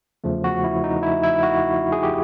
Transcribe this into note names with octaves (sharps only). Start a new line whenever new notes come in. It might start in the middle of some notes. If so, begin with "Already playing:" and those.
E2 C#3 F3 A3
F#4
E4
D#4
E4
E4
F#4
G#4
G4